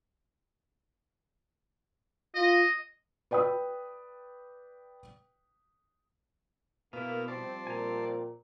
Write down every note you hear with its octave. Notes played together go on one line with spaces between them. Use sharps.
F4 D#5
B4 D5 G5 B5 D#6
B2 A#3 B3 E4 F5
F3 G3 C4 C5 D5 A5
A#2 G#5 A#5